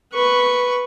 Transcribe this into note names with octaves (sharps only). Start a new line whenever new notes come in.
B4 C#6